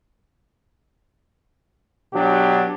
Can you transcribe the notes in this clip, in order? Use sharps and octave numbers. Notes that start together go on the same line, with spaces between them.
B2 F#3 D4 G4